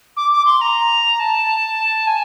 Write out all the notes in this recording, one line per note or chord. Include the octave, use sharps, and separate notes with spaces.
D6
D6
C6
A#5
A5
G#5